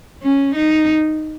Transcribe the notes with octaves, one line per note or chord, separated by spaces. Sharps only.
C#4
D#4